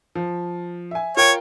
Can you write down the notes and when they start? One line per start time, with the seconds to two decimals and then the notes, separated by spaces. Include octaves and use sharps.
0.15 F3
0.91 E5 G#5
1.17 F4 A#4 C#5 G5